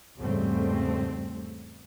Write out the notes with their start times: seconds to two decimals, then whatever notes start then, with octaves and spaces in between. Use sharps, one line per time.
0.18 E2 G#2 C#3 G3 A3 C4